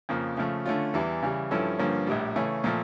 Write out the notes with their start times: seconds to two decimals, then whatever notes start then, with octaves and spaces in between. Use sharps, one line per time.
0.09 F2 C#3 F3 A#3
0.37 C#3 F3 A3
0.66 D3 A3 C#4 F4
0.94 E2 E3 G3
1.22 C#3 E3 G3
1.51 G2 F3 C#4 E4 A4
1.79 G2 D3 F3 A#3 C#4
2.07 A#1 A2 G3
2.35 C#3 E3 A3 C#4
2.64 A#2 F3 A3